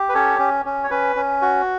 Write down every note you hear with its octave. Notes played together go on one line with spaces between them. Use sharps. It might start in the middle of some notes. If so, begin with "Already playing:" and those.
Already playing: G4
B4
C#4 A4 C#5
C#4
C#4
C#5
C#4 B4
C#4
F#4